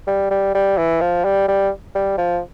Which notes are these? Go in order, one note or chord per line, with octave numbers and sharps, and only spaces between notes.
G3
G3
G3
E3
F3
G3
G3
G3
F3